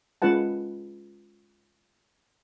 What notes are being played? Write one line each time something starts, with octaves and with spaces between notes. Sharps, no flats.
G#3 C#4 F4 B4 F#5 A5